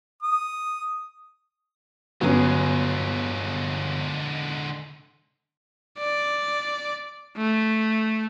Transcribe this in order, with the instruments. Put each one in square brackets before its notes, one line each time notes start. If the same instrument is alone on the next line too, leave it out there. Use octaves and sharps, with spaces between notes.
[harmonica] D#6
[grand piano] G1 [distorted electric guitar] D3 G#3 [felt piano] F#3 B3 C#4
[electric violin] D5
A3